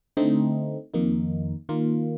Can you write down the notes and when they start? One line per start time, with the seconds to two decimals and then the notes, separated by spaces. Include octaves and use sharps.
0.17 D3 A3 C4 D#4
0.94 F2 D#3 A#3 D#4
1.69 D#3 A#3 F4